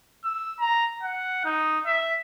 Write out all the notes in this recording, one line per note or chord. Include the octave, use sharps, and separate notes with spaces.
E6
A#5
F#5
D#4
E5